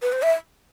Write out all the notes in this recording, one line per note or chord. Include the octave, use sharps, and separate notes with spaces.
B4
C5
E5